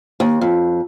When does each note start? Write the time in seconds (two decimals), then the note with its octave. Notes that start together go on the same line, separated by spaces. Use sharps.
0.20 D#2
0.41 F2